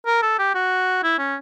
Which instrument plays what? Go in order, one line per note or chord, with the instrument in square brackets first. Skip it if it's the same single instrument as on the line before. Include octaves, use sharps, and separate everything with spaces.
[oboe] A#4
A4
G4
F#4
E4
C#4